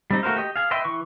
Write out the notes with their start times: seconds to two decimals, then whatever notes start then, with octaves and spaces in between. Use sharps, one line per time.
0.11 G3 C4 D#4
0.23 A3 F#4 A#4 C5 F5
0.36 G4 D#5
0.56 G#4 F5
0.71 B4 D#5 E5 G5 C6
0.85 E3 C#6